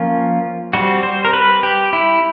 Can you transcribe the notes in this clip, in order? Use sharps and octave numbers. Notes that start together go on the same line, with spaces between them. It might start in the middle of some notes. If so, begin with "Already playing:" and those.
Already playing: F3 A#3 C#4 F4
G3 C4 F#4
C5
A#4
B4
G4
E4